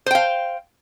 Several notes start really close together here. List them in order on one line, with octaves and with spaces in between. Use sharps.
C5 G5 F5